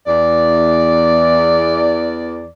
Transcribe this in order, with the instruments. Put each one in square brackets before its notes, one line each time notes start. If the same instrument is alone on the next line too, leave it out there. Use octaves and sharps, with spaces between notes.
[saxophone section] E2 D5